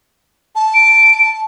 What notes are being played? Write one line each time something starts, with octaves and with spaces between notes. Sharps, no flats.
A5
D7